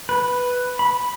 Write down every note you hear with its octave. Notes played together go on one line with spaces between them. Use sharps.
B4
B5